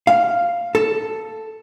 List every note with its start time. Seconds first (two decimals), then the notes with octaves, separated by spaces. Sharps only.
0.07 F5
0.75 A4